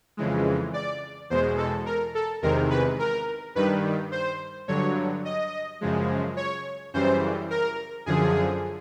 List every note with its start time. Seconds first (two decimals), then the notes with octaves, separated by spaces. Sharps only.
0.17 F2 C#3 E3 G#3
0.74 D5
1.30 E2 B2 G#3 C5
1.57 A4
1.86 A#4
2.15 A4
2.42 E2 C3 D#3 G#3 A#4
2.70 B4
2.99 A#4
3.55 G2 D#3 G3 B4
4.12 C5
4.68 G2 D3 F#3 C#5
5.25 D#5
5.81 F#2 C#3 F3 G#3
6.37 C#5
6.94 F#2 C#3 E3 G3 C5
7.50 A#4
8.06 F#2 D3 F3 G#4